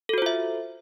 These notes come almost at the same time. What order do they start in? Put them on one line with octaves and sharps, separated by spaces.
A4 F#4 C5 F4 E5